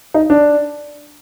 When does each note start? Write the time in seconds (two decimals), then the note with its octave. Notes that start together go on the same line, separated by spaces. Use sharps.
0.14 D#4
0.30 D4